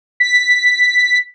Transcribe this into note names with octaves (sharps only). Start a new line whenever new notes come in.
B6